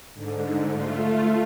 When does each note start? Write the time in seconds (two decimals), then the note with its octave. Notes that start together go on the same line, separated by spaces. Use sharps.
0.14 G#2 D3
0.70 A3 F4